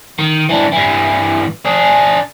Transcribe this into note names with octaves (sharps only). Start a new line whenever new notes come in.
D#3
E3 D4
G2 E3
D4 G#4